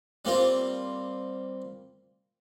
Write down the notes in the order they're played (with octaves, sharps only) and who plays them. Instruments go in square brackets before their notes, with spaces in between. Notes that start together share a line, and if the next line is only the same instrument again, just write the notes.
[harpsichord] G3 A#3 C4 F4